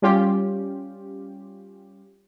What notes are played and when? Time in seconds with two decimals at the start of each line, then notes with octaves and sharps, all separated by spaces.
0.02 G3 C#4 F4 G4